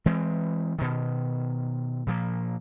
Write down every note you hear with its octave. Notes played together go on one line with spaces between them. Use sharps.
E3 G#3 C4
B2 D#3
A#2 F3 A#3